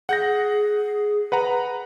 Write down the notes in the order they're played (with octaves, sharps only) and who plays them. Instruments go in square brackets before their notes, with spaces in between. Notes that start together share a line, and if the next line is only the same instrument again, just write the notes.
[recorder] G#4 [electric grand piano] F#5 G6 A#6
[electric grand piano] B4 F#5 A#5